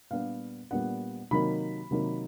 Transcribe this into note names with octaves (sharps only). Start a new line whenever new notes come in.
A#2 G3 B3 D4 F5
A#2 G3 B3 D4 F#5
C3 D#3 F#3 A#3 D#4 B5
C3 D#3 F#3 A#3 D#4